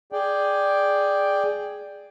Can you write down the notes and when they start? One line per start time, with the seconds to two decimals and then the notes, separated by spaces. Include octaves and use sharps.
0.12 G#4 D5 G5